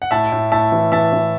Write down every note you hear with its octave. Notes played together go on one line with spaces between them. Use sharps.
F#5
A2 E5 A5
A2
A2 E5 A5
E3
E3 E5 A5
E3